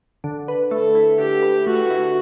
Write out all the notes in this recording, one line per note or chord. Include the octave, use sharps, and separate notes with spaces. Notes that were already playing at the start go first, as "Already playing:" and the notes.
D3
B4
A3 A4
E4
D3 G4
B4
A3 F#4
E4